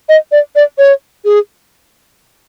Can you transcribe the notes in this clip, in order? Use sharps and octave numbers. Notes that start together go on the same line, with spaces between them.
D#5
D5
D5
C#5
G#4